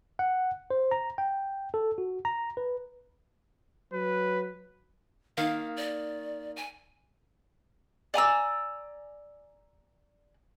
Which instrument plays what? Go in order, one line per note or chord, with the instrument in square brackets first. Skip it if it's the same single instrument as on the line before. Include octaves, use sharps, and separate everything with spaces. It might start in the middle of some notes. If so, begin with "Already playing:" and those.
[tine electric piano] F#5
C5
A#5
G5
A4
F#4
A#5
B4
[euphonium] F#3 [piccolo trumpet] B4
[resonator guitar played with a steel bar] D#3 A#3 [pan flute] F5
[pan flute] D5
G#5
[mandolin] D5 G#5 A#5 E6